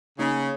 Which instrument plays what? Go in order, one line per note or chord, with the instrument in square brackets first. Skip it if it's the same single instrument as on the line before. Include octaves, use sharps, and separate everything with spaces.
[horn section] C#3 [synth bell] A#3 D#4 G#4 C#5